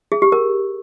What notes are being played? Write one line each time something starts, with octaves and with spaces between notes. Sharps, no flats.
G#4
G4
A#4